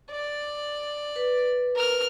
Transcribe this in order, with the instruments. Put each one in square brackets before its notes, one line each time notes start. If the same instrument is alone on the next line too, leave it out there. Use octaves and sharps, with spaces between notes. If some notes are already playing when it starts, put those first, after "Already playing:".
[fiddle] D5
[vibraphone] B4
[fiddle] A#4 F6